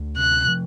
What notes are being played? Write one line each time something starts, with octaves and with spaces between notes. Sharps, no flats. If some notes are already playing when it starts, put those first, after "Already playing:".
Already playing: D2
C3 F#6
F3